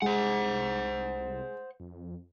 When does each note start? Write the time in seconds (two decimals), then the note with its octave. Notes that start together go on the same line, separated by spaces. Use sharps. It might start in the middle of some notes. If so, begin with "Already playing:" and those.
0.02 C2 G#3 C5 F#5
1.80 F2